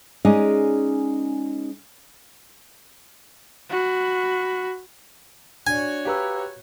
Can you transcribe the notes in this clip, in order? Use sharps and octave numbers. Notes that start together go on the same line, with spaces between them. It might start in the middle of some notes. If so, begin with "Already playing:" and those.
G#3 C#4 D#4 G#4 D5 D#5
F#4 B5
D4 F#4 C#5 D5 G#5
G4 B4 F5 A#5 E6